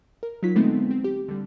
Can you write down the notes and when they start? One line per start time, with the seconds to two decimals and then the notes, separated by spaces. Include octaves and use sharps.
0.23 A#4
0.43 F#3 D#4 F4 B6
0.55 D3 G#3 A3 B3 C4 D#4
0.91 C4
1.04 G4
1.28 D3 G3